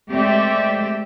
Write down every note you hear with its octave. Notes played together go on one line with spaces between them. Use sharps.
G#3 A3 C4 G4 D5 E5